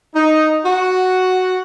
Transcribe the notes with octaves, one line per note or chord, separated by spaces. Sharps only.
D#4
F#4